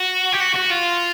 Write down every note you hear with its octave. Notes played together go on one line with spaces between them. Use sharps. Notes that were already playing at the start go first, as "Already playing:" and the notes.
Already playing: F#4
G4
F#4
F#4
F4